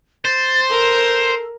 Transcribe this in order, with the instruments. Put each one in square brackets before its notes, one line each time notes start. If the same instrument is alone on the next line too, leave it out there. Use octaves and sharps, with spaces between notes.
[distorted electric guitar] C5 [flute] A6
[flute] A4 [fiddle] A#4